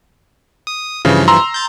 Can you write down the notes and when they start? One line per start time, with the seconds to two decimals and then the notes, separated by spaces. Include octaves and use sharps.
0.67 D#6
1.05 G2 C#3 E3 F3
1.28 A#5 C6 E6
1.54 G6 A6